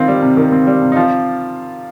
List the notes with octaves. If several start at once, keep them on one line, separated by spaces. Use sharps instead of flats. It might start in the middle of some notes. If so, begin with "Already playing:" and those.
Already playing: D#3 C4 F4
G3
C3
D#3
C4
G3
C3
D#4
F3 F4